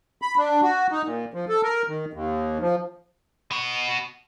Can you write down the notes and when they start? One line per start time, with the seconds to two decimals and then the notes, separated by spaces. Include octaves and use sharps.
0.22 B5
0.38 D4
0.63 F#4
0.91 D#4
1.04 A#2
1.34 F3
1.49 A4
1.63 A#4
1.88 D#3
2.14 D#2
2.61 F3
3.51 B3 F#4